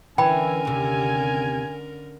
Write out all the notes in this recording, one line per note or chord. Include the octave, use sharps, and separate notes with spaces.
D3 E3 C#4 A#4 G5 G#5 B5
D#2 C3